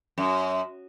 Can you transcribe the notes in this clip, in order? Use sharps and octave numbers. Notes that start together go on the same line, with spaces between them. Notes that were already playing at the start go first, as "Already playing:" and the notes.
F#2